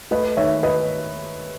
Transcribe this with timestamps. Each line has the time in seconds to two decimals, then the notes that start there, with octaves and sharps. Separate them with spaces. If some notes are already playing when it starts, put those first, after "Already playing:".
0.11 A3 B4 D#5
0.37 D#3 C#5 E5
0.63 B4 D#5